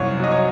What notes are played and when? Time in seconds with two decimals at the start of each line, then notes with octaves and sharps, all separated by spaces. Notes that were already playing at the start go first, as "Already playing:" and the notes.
Already playing: C2 F#2 C#5
0.20 F#3 D#5
0.32 C#5